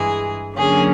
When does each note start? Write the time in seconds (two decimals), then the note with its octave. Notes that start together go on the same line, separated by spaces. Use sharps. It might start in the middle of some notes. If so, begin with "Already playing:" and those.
Already playing: G2 E3 G#3 G#4
0.56 D3 F#3 A#3 C#4 G#4